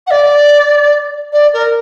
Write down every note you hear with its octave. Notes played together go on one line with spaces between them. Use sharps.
F#5
D5
D5
A#4